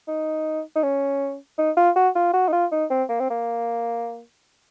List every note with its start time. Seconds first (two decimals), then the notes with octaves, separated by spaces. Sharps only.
0.08 D#4
0.76 D#4
0.83 C#4
1.58 D#4
1.77 F4
1.96 F#4
2.15 F4
2.33 F#4
2.48 D#4
2.52 F4
2.72 D#4
2.90 C4
3.09 A#3
3.20 C4
3.30 A#3